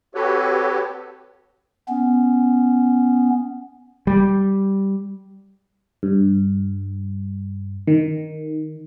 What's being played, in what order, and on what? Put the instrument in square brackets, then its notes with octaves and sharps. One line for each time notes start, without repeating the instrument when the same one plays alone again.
[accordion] C4 F#4 G4 A4 B4 C#5
[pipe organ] B3 C#4
[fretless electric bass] G3
[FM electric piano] G2
D#3